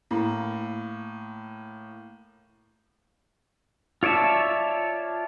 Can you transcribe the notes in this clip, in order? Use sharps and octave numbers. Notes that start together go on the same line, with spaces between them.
A2 A#3
F4 C#5 D5 E5 A5